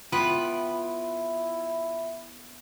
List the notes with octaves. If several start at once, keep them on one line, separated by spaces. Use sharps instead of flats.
B3 E4 F4 B4 G5 B5